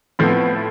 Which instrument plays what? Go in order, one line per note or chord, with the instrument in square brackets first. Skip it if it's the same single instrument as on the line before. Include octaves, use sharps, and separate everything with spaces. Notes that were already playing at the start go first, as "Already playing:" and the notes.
[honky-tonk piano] A2 F3 A3 C4 [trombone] B3